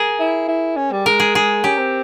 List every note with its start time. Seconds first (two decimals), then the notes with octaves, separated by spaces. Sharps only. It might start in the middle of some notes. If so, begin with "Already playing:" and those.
Already playing: G#4 A#4
0.19 E4
0.48 E4
0.76 C#4
0.92 G3
1.06 G#3 A#4
1.20 G#4
1.35 G#4
1.64 C#4 G4
1.78 C4